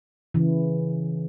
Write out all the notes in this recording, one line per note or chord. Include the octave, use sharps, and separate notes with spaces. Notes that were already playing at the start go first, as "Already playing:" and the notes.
C#3 E3